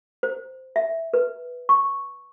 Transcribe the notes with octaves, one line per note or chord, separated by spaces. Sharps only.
C5
E5
B4
C#6